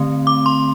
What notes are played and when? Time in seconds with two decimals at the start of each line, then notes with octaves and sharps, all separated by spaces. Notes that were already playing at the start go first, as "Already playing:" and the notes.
Already playing: D3 A3 C4
0.27 D6
0.46 C6